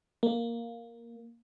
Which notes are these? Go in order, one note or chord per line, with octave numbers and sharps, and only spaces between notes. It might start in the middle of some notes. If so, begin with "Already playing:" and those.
A#3